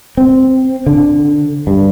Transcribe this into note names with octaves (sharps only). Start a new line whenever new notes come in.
C4
D3
G2